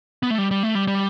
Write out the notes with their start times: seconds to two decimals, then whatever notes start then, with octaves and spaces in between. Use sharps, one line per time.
0.23 B3
0.30 A3
0.38 G3
0.51 G3
0.63 A3
0.75 G3
0.88 G3